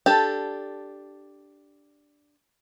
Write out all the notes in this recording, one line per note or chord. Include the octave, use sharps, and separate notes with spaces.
D4 G4 A4